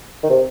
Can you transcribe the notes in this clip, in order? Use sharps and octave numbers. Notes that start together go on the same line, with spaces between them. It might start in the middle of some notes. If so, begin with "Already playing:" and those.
D#3
C3